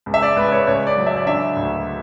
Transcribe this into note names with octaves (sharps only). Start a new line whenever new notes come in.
C#2
E5
D5
C#2 B4
C#5
C#2 C#5
D5
F#3
E5
D5
D3 E5
D2